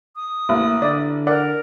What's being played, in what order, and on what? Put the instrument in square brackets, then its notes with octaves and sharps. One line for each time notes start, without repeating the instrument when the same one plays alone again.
[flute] D#6
[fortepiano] A1 [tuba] A#3
[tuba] D3 [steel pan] D5 E5
[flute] A#4 [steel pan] D5 [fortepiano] F#5